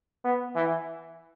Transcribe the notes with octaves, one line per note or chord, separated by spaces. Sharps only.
B3
E3